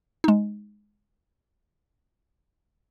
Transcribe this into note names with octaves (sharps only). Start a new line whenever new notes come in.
G#3 D#4